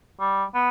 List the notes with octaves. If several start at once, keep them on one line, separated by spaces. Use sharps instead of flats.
G3
B3